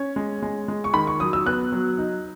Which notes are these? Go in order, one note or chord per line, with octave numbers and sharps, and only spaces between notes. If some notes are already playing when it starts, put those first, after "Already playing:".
Already playing: C#4 C#5
G#3
G#3
G#3
C#6
D#3 B5
C#6
F#3 D#6
E6
B3 F#6
F#3
D#4